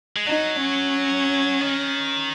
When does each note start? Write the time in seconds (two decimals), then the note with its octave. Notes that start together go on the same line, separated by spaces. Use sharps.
0.16 G#3
0.26 F#3 D#4
0.60 C#4
1.61 D#3